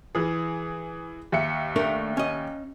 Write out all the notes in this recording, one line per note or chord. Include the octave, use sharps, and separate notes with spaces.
E3 G#4
D#2 E5 C#7
A3 D4 A#4
C#4 D#5